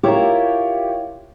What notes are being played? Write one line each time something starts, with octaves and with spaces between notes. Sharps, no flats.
E4 F4 G4 A#4 C#5